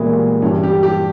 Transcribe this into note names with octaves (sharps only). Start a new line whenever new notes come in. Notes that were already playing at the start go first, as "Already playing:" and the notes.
Already playing: A#2 E3 G3 G#3 A#3 B3 E4 G#4
G2 E3 G3 C#4
G4
G4